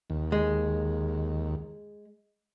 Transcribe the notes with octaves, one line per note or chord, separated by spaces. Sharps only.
D#2
G#3